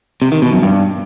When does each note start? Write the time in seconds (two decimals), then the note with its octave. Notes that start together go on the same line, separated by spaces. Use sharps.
0.22 C3
0.32 D#3
0.42 B2
0.52 F#2
0.62 G2